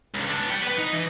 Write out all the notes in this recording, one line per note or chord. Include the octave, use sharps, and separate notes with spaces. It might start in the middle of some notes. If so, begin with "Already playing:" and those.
C#2 D3
B3 D4
D5 G5
B3 B4
D#4
E3